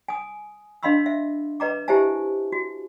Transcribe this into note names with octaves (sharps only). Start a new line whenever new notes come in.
G#5 D#6
D4 D#5 F5 B5 C6 E6
E5
B4 D#5 A#5 D6
E4 G4 C5 E5 G#5 A5
F#4